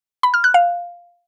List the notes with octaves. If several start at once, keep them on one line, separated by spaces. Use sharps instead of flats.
B5
F6
F#6
F5